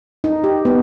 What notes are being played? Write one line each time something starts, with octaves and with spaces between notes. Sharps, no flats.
D#4
G4
B3